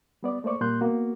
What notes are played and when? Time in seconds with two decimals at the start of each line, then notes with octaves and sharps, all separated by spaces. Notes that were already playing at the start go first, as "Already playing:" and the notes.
0.23 G3 B3 D5
0.44 A3 A#3 C5 D5 C#6
0.61 A#2 G3 A#3 C6 F#6 G6
0.81 A#3 B3 F#4